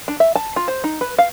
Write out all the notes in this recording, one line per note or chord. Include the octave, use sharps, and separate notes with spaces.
D4
E5
A5
F4
C5
D#4
B4
F5